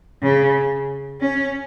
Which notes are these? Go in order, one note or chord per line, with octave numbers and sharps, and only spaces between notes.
C#3
C#4